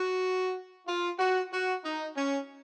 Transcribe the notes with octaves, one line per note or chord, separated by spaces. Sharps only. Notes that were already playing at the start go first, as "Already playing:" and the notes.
Already playing: F#4
F4
F#4
F#4
D#4
C#4